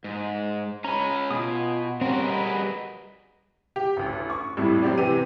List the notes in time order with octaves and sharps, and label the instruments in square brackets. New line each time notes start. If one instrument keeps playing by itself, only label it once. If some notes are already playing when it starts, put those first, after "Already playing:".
[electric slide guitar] G#2
[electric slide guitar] G#3 C#4 [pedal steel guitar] A#5 B5
[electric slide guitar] B2 [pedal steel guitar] F4 G#5 D#6
[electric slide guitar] G3 F#4 A#4 [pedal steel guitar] C4 C#4
[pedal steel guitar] G#4 B4 D#5
[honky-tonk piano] G4
A1 D2
C#6
F2 A2 G3 E4
F#3 C4 G4 D5
C3 E3 G4 D#7